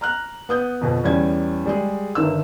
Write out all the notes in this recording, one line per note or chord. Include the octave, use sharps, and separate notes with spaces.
A#5 F6 F#6
B3 D#6 G6
F2 B2
E2 G3 C#4 G#6
G3 G#3 G#4
G1 G2 D#3 E6